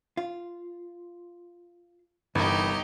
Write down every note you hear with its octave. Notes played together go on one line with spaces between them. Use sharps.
F4
G1 C2 G2 E3 D#4 G4 A#4